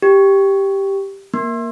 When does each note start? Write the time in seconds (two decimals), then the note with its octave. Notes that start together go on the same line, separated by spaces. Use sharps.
0.02 G4
1.34 A#3